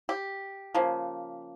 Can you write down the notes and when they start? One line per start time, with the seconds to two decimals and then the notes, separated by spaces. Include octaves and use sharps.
0.09 G4
0.74 C#3 F3 A#3